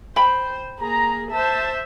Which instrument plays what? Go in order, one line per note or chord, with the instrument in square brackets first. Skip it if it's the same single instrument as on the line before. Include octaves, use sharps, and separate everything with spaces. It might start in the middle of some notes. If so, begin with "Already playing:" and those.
[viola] C5 [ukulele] G5 B5
[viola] A#3 G#4 [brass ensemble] A#5
[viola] C5 E5 [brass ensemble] A5